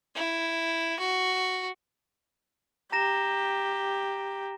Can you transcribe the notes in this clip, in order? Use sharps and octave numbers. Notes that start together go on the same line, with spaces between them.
E4
F#4
G4 A#5 A#6 E7